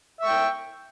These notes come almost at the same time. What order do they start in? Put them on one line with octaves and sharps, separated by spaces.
E5 C#6 G5